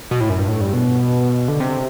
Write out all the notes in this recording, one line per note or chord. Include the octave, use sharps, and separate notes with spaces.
B2
A2
F#2
G2
A2
G2
B2
D3
C3